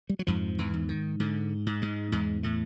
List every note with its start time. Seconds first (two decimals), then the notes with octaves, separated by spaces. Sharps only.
0.09 G3
0.19 F#3
0.27 F2 G#2 F3
0.58 E2 E3
0.74 G#2
0.89 D#3
1.20 G#2 D3
1.66 G#2
1.82 G#2 G#3
2.12 E2 G#2 G#3
2.43 A2 A3